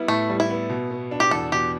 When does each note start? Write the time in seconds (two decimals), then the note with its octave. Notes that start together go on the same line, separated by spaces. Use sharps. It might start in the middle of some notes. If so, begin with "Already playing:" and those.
Already playing: G3 B3 E4
0.08 A2 A3
0.30 G3
0.40 E4
0.50 B3
0.69 B2
0.91 B3
1.11 D4
1.20 G4
1.31 E2 A4
1.52 B2 G4